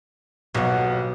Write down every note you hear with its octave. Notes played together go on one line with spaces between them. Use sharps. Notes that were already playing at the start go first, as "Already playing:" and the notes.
D#1 B1 B2 F#3 F#4